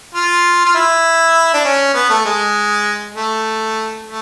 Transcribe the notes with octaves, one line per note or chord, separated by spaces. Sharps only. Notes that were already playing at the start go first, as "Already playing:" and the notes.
F4
F4
E4
D4
C#4
B3
A3
G#3
A3
A3